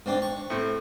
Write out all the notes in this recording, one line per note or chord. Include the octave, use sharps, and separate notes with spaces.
G#2 C4 D4
C#6
A2 C4